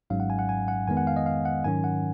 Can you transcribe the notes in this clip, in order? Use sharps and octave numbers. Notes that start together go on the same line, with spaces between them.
G#1 G#2 F#3 C#4 F5
F#5
G#5
F#5
G#5
F#5
F2 D#3 G#3 B3 G#5
F#5
F5
D#5
F5
F#5
G#2 D#3 F#3 C#4 G#5
F#5